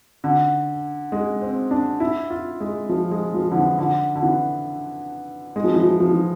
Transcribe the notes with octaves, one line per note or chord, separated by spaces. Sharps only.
D3
G#3
C4
D4
E4
F4
G#3
F3
G#3
F3
D3
E3
D3
D3
E3
G#3
F3
E3
F3
F3
E3